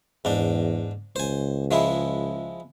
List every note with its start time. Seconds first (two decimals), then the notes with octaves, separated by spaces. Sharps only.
0.25 E2 G#2 D4
1.16 C#2 C5 G#5
1.71 F3 G#3 E4